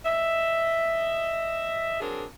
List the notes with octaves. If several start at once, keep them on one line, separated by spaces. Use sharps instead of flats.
D#5 E5
F#3 C4 D4 G#4 A#4